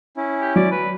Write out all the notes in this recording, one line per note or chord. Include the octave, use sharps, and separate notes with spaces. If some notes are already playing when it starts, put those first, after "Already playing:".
C#4 E4
G4
F#3 D5
B4